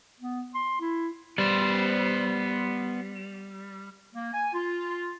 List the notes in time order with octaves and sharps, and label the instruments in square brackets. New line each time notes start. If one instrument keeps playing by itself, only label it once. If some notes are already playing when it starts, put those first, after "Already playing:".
[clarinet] B3
C6
E4
[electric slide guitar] G3 [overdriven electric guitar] B3 C5
[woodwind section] A#3
G#5
F4